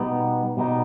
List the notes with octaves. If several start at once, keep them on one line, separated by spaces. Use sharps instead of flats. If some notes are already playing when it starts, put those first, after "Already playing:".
Already playing: B2 G3 B3 D#4
B2 G3 B3 D#4